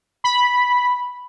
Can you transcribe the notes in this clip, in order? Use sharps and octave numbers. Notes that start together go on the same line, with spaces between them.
B5